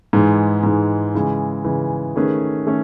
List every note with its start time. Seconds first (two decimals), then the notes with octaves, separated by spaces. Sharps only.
0.13 G#2 E3 G#3
0.63 G#2 E3 G#3
1.14 C#3 E3 G#3
1.64 C#3 E3 G#3
2.16 D#3 A3 C#4 G#4 B4
2.67 D#3 A3 C#4